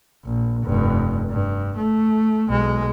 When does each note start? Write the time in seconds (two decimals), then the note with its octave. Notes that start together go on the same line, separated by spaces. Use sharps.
0.25 A#1
0.64 F1 G2
1.30 G2
1.77 A3
2.48 B1 G#3